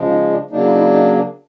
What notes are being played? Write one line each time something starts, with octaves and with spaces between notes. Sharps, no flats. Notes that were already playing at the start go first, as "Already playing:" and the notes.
Already playing: C#3 F3 G#3
D#4
D4
C#3 F#3 A#3 D4 D#4
E4
D#4
E4
D#4
D4